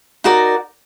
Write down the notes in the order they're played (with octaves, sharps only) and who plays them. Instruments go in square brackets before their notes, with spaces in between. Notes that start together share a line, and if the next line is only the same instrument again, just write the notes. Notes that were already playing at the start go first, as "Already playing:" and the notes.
[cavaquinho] D#4 F#4 A#4 D5